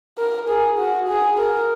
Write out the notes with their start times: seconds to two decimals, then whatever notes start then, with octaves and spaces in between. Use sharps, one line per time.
0.18 A#4
0.49 G#4
0.78 F#4
1.08 G#4
1.38 A#4